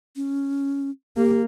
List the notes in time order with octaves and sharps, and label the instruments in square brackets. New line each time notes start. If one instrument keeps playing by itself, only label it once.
[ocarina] C#4
[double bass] A#3 [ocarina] G4